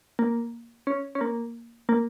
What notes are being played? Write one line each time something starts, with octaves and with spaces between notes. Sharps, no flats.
A#3
C#4
C#4
A#3
A#3